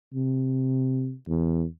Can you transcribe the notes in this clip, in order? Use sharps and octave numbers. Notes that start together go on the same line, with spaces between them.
C3
E2